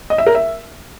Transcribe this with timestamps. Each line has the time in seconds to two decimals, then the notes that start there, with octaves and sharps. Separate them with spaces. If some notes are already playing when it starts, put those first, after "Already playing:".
0.10 D#5
0.18 E5
0.26 A#4
0.35 E5